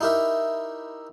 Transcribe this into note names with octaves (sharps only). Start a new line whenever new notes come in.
D#4 E4 G4 A#4 E5